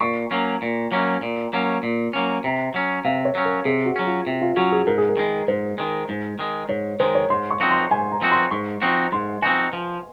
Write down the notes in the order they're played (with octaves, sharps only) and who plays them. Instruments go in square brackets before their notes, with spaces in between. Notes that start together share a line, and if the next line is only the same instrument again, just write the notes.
[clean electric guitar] A#2 [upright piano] C#6
[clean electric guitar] F#3 A#3 C#4
A#2
F#3 A#3 C#4
A#2
F#3 A#3 C#4
A#2
F#3 A#3 C#4
[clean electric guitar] C3 [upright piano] A#5
[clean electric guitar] F#3 C#4
[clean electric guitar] C3 [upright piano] F5
[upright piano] C#5
[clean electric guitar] F#3 C#4
[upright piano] A#4
[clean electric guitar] C3 [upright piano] G#4
[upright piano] F#4
[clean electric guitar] F#3 C#4
[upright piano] F4
[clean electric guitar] C3
[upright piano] F4
[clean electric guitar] F#3 C#4 [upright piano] F#4
[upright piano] G#4
[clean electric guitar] G#2 [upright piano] A#4
[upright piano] G#4
A#4
[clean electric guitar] D#3 G#3
[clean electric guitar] G#2 [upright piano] C5
[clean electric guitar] D#3 G#3
G#2
D#3 G#3
[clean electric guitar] G#2 [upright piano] C#5
[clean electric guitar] D#3 G#3 [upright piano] C5
[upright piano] C#5
[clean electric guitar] G#2 [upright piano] C6
[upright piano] C#6
[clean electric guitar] F3 C4 D#4 F#4
[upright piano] C6
[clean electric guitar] G#2 [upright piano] G#5
[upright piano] A#5
[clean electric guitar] F3 C4 D#4 F#4
[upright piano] C6
[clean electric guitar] G#2 [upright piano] C#6
[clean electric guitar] F3 C4 D#4 F#4
[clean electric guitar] G#2 [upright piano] C6
[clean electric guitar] F3 C4 D#4 F#4 [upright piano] G#5
[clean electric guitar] F3